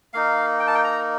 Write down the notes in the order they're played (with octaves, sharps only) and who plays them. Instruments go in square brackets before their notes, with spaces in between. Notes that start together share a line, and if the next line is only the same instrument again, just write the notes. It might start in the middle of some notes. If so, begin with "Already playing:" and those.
[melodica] A#3 D#4 F5
G5
A5
G5
A#5